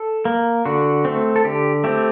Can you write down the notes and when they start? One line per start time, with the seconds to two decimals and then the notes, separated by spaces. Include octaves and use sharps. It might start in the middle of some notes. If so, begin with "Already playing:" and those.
Already playing: A4
0.25 A#3
0.66 D3 F#4
1.05 A3 C4
1.36 A4
1.44 D3 G4
1.84 A3 C4 G4